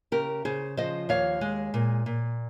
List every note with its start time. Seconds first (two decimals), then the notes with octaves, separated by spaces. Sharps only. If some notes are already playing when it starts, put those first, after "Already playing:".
0.12 C#3 G4 A#4
0.45 C#3 G#4 C5
0.77 F3 C5 D#5
1.09 D#2 C#5 F5
1.41 G#3
1.74 A#2
2.06 A#2